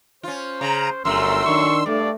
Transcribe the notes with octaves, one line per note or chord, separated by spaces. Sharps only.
C#4 F4 C5
C#3 A#5
G1 F#2 A3 A#4 C6 E6
D#3 D4 C#6
G2 A3 D5